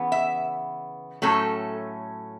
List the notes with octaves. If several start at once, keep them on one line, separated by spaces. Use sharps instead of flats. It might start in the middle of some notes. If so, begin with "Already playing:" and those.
Already playing: C#3 E3 B3
E5
A2 F#3 A3 C#4 A4